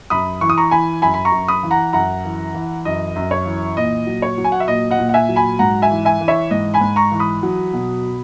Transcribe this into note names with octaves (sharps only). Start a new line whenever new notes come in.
F#2 B5 D#6
E3 C#6
D#6
A#5 C#6
E3 G#5 B5
F#2 G#5 B5
B5
A#5 C#6
F#2
B5 D#6
E3
F#5 A#5
F#2 F#5 A#5
E3
E3
F#2 D#5
F#2
C#5
E3
A#2 D#5
F#3
C#5
F#3
G#5
F#5
E5
A#2 D#5
D#5 F#5
A#2
F#5
E5 G#5
F#3
G#5 B5
G#2 F#5 A#5
E5 G#5
E3
E5 G#5
E3
C#5 E5
G#2 D#5
G#5 B5
G#2
A#5 C#6
E3
B5 D#6
F#3
B2